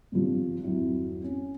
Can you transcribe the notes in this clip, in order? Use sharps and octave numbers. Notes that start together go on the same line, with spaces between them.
G#1 G2 F3
G#1 F2 F#3 E4
C#4